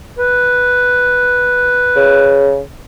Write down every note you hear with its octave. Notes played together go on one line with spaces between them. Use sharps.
B4
C#3